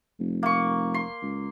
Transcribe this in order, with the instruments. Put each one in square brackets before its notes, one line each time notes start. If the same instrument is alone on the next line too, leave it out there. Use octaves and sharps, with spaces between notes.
[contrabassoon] F1
[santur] A#3 C#6
C6
[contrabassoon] C#2